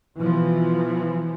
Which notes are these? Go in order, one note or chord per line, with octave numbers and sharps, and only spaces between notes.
B2 E3 F3